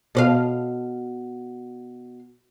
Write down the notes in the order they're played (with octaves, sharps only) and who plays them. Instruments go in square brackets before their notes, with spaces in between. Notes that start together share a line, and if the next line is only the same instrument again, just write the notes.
[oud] B2 D5 F5